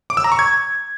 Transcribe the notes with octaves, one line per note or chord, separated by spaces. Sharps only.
D6
E6
A#5
C#6
G#6